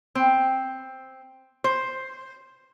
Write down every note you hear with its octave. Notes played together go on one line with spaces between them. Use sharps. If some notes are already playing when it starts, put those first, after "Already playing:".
C4
C5